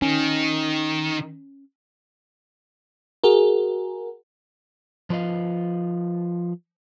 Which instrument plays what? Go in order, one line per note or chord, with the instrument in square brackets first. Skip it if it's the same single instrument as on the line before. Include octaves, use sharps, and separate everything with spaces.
[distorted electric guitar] D#3 [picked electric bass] C#4
[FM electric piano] F#4 G#4 A#4
[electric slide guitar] F3 F4 B4 D#5 F5